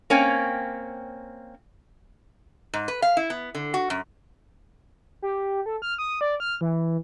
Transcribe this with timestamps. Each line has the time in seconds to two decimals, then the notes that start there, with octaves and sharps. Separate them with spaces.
0.10 A#3 C4 C#4 C#5 G5 G#5
2.74 G#2
2.88 B4
3.02 F5
3.17 E4
3.30 B3
3.55 D3
3.74 F#4
3.90 F#2
5.22 G4
5.66 A4
5.82 F6
5.98 D#6
6.21 D5
6.40 F6
6.61 E3